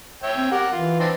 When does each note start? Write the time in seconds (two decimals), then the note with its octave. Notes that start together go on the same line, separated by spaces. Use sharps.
0.23 C#5 E5 G5
0.36 C4
0.51 G4 A#4 F#5
0.72 E3 F4
0.99 C4 D4 D#4